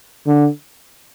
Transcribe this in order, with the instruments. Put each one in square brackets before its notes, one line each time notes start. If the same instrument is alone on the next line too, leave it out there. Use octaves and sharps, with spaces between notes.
[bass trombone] D3